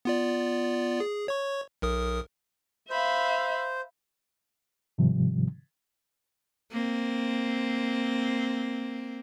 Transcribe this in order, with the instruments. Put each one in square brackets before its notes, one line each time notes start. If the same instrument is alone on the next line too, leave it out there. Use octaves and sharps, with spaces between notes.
[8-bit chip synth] B3 F4 D5
G#4
C#5 C#6
B1 A#4 D#6
[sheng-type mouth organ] C5 [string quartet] E5 F5 B5
[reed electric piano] G#2 C3 D#3 F3 G3
[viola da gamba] A#3 C4